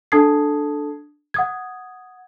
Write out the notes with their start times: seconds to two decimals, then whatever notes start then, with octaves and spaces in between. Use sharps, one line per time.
0.12 D4 A4 A5 D#6 G#6 C7
1.34 F#5 D#6 G#6